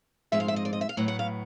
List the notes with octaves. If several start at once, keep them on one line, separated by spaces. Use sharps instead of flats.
G#2 F3 G#3 C4 E5
F5
E5
D#5
D5
D#5
E5
F5
A2 F#3 B3 F#5
F#5
F5